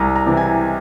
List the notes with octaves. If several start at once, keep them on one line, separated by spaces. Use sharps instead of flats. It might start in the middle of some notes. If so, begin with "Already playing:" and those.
Already playing: C2 A#5
A#5
C3 E3
G#5